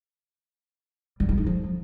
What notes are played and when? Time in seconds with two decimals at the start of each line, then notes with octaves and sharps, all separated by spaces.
1.20 G3
1.29 E4
1.38 D#4
1.46 F3